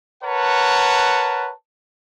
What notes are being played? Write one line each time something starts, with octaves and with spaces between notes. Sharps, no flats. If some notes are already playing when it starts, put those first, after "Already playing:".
A#4 B4 C#5 F#5 A5